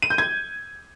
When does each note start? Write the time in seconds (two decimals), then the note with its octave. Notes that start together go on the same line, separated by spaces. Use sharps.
0.02 D#7
0.10 G6
0.18 G#6